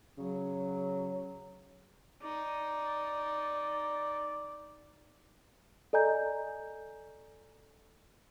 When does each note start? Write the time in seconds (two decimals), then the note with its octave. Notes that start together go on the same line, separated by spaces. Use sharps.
0.18 C#3 F#3
2.22 D#4 D5
5.93 A4 D5 D#5 G#5 A#5 G6